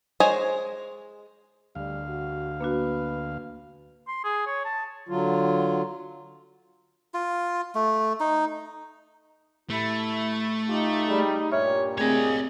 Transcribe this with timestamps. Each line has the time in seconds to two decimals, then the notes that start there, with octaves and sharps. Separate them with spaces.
0.20 G#3 C5 C#5 D#5 G#5
1.75 D2 G3 F5
2.08 F#4
2.61 A#3 D4 F#4 B4
4.08 C6
4.24 G#4
4.47 C#5
4.65 A5
5.09 D3 F#3 F4
7.14 F4
7.75 A3
8.20 D#4
9.70 A2 A3 E4
10.68 D#4 F4 G4
11.08 G3 G#4
11.52 G2 A#2 G4 C#5 E5 F6
11.98 A3 C4 G#4 C#5 D#5